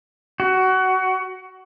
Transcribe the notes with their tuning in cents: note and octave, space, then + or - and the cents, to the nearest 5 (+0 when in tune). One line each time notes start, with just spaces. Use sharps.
F#4 +20